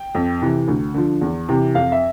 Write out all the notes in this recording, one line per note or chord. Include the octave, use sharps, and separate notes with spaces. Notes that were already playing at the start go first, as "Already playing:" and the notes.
Already playing: G5
F2
C3 E3
D2
D3 F3
E2
C3 E3
F2 F5
E5